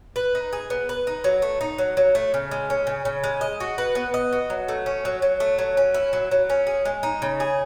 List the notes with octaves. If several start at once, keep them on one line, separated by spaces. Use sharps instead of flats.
B4
D#4
G#4
B3
B4
D#4
F#3
A3
D#4
F#3
F#3
A3
C#3
G#3
C#4
C#3
C#3
G#3
D#5
F#4
B4
B3
D#5
F#4
F#3
A3
C#4
F#3
F#3
A3
F#3
C#4
E4
F#3
F#3
C#4
G#4
G#3
D#4
C#3
G#4